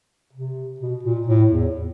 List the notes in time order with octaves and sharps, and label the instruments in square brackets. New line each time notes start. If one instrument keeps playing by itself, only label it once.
[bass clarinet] C3
B2
A#2
A2
E2